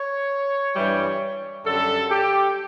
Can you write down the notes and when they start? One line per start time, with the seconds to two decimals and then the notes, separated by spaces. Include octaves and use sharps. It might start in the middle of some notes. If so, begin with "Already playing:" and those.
Already playing: C#5
0.75 G2 E3 G3
1.65 F#2 D3 G3 A4
2.10 G4